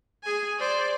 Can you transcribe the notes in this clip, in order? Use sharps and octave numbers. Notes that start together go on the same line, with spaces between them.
G#4 G#5
C5 D5